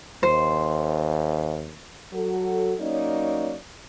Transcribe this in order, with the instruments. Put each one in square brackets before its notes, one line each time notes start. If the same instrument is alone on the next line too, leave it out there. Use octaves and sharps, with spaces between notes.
[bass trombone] D#2 [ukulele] C5
[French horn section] F#3 F#4 A4
F#3 A#3 C#4 D#4 C#5 D5